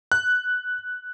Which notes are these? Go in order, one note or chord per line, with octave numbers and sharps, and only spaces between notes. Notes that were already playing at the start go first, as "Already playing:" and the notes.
F#6